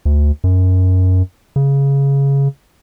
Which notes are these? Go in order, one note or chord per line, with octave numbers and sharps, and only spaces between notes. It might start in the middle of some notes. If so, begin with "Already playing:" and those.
D2
F#2
C#3